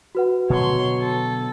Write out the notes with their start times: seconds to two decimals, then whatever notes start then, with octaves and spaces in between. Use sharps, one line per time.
0.15 F#4 B4 F#5
0.50 B2 D3 F#3 C#5 C6
1.01 A4